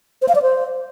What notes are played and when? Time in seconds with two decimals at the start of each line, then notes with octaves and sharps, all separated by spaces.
0.22 C5
0.29 F5
0.35 D5
0.42 C5